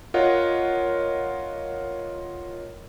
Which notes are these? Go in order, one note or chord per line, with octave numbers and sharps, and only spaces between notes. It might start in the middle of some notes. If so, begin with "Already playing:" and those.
F4 A#4 C#5 D#5 F#5